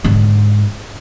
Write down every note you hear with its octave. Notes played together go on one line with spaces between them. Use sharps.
G#2 D3